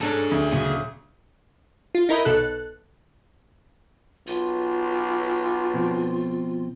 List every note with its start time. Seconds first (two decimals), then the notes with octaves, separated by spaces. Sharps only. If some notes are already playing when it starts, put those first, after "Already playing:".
0.01 C#4 D4 G#4 A4 A#5
0.31 D2
0.53 A#2 C#3 F#3
1.95 F4
2.09 D#4 E4 A#4 D#5 B5
2.25 B1 B2 A4 F#6
4.27 B1 F4
5.74 B2 F3 C4